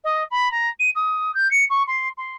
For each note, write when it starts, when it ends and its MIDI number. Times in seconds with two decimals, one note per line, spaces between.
0.03 0.23 75
0.30 0.50 83
0.51 0.69 82
0.79 0.90 99
0.95 1.33 87
1.34 1.50 91
1.50 1.64 97
1.69 1.82 85
1.87 2.08 84
2.17 2.36 84